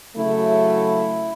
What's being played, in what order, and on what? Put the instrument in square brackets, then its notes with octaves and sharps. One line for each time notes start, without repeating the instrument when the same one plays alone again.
[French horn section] C#3 F#3 A3 [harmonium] E4